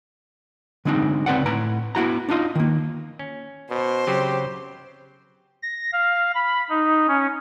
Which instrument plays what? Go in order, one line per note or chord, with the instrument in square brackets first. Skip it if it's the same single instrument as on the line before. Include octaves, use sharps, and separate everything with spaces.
[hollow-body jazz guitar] D3 G#3 C4 D4 D#4
C#2 C4 B4 D5 F#5
A2 B4 A#5
B3 E4 F#4 A#5
D4 D#4 F4 D#5
D#3 A#3
[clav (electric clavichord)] C#4
[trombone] B2 [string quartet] C5
[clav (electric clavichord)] C#3 F#3 C4 [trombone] G4
[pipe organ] A#6
F5
B5
D#4
C#4